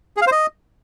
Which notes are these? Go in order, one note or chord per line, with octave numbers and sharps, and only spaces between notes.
G#4
F5
C5
D#5